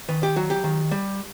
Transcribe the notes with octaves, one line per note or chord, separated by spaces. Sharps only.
D#3 B4
G4
F#3 F#4
G4
D#3
G3